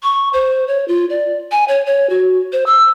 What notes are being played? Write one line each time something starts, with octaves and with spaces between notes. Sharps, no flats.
C#6
C5
C#5
F4
D5
G#5
C#5
C#5
F#4
C5
E6